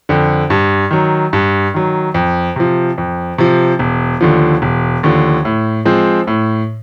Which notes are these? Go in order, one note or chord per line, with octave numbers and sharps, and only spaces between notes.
F2 D3
G2
D#3 F#3
G2
D#3 F#3
F2
C3 F3
F2
C3 F3
E1
D#2 D3 F3
E1
D#2 D3 F3
A2
F3 G#3 C4
A2